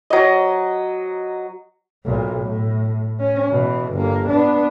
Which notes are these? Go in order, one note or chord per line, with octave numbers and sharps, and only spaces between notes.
F#3 D#5
B1 A#2
A2
C#4
B2 E3
G1 A#3
B3 D4